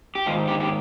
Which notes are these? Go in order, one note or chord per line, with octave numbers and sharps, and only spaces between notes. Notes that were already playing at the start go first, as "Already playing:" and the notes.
G4
G#2 D#3 F4
G4
G4